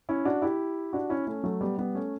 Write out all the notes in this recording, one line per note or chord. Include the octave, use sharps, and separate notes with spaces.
C#4 E4
D4 F#4
E4 G4
D4 F#4
C#4 E4
A3 C#4
F#3 A3
G3 B3
G3 B3
A3 C#4